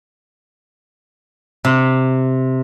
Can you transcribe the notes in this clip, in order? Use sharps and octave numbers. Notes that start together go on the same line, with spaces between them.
C3